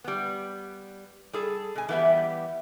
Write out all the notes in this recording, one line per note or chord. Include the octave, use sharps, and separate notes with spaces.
G3 B3
G3 G#4 A4
B2 G#5
E3 G3 B3 G4 E5